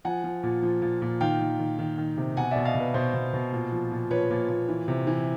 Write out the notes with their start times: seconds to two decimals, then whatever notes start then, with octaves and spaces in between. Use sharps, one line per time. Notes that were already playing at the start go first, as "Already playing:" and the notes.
0.05 F3 F#5 G#5
0.24 F3
0.43 A#2
0.62 F3
0.82 A#2
1.02 A#2
1.21 D#3 F5 G5
1.40 D#3
1.59 D#3
1.79 D#3
1.98 D#3
2.17 C3
2.37 B2 F#5 G#5
2.51 B2 D5 E5
2.65 D#5 F5
2.75 B2
2.80 B4
2.94 B2 C5
3.14 B2
3.34 B2
3.53 A#2
3.72 F3
3.92 A#2
4.10 F3 B4 C#5
4.31 A#2
4.49 A#2
4.69 E3
4.88 C3
5.07 E3